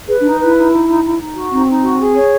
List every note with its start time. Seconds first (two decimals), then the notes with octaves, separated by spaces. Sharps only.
0.08 G#4 B4
0.20 D4
0.24 D#4
0.39 E4 B4
0.56 D#4
0.72 D#4
0.88 D#4
1.03 D#4
1.19 D#4
1.35 F#4
1.51 C4 D#4
1.67 D#4
1.84 F#4
1.99 G#4
2.15 C#5